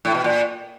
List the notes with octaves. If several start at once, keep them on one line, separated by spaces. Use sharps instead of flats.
A2
B2
A#2